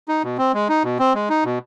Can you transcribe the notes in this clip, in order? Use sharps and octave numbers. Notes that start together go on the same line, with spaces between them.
D#4
B2
C4
G#3
D#4
B2
C4
G#3
D#4
B2